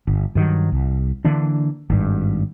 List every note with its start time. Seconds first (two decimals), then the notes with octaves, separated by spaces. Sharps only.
0.07 G1
0.35 G2 D#3 F#3
0.72 C2
1.25 D3 E3 A#3 D4
1.90 G#1 G2